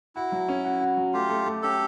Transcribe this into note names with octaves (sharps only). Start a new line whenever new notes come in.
E4 F#4
F#3
C#4
F#4
F#4
F#3
A3 F4 G4
A3
A3
C#4 G4 A4